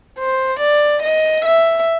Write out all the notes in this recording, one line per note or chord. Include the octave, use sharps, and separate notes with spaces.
C5
D5
D#5
E5